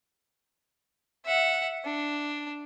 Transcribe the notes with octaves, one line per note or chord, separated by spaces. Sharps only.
E5 F#5
D4